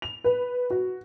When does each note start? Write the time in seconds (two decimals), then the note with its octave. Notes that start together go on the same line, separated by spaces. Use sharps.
0.02 F7
0.24 B4
0.70 F#4